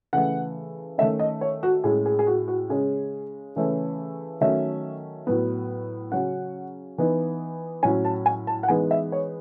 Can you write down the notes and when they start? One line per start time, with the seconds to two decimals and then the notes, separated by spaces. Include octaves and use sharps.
0.13 C#3 E3 A3 F#5
0.98 D#3 A3 C#4 E5
1.19 D#5
1.41 C#5
1.63 F#4
1.84 A2 G#3 C#4 G#4
2.06 G#4
2.19 G#4
2.27 F#4
2.48 F#4
2.69 C#3 G#3 C#4 G#4
3.56 C#3 E3 A3 C#4
4.41 D#3 F#3 A3 C#4 E5
5.27 A2 F#3 B3
6.12 C#3 F#3 C#4 F#5
6.98 E3 B3 D#4
7.83 A2 F#3 C#4 G#5
8.05 A5
8.26 G#5
8.47 A5
8.63 F#5
8.68 E3 G#3 B3 D#4 G#5
8.91 E5
9.12 C#5